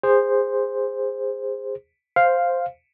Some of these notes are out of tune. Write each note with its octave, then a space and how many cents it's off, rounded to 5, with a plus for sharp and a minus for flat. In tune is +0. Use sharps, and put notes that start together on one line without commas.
G#4 -25 C5 +0
C5 +0 F5 +0